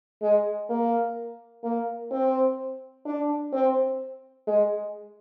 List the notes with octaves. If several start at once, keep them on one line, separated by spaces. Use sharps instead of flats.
G#3
A#3
A#3
C4
D4
C4
G#3